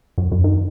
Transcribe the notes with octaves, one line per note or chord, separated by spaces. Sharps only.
F#2
F#2
D#3